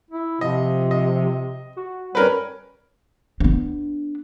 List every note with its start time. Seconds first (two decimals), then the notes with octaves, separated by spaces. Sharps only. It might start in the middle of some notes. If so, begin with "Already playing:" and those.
0.11 E4
0.41 C3 F3 D#5
0.91 D#5
1.76 F#4
2.15 G3 C#4 A#4 B4
3.40 B3 D4